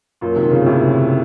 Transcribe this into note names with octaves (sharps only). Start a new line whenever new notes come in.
F#2 A#2
C3 D#3
A#2 C#3
A2 C3